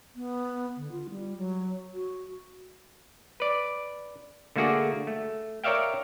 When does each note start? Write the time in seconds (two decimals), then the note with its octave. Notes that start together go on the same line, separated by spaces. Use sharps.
0.16 B3
0.77 D3
0.92 F4
1.10 G3
1.38 F#3
1.94 F#4
3.40 B4 D5
4.56 D3 A3 A#3 F#4 G#4 D5
5.07 A3
5.64 A#4 C#5 D5 E5 F5 G5